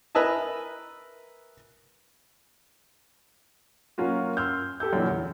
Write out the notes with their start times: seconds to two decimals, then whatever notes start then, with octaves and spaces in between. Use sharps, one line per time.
0.15 A#4 B4 D#5 E5 G#5 A5
3.98 F#3 A#3 C#4 F4 F#4
4.37 C6 E6 F6 G6
4.80 G4 A4 E6 G6
4.93 F#2 A#2 E3
5.08 E2